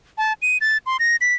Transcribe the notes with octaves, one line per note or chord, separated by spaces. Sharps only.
A5
D#7
A6
C6
A#6
B6